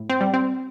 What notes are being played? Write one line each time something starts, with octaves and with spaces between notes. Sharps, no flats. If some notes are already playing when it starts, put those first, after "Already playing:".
Already playing: A2
C4
G3
C4